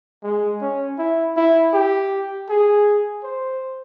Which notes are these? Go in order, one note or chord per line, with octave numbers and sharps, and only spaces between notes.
G#3
C#4
E4
E4
G4
G#4
C5